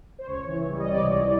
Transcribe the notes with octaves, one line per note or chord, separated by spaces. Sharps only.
C5
C#2 C#5
E3
G3
D#5
C3 D5
C#2